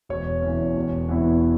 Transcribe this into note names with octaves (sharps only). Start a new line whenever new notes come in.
E1 C#5
E2 E3 C#4
E1
E2 E3 B3 E4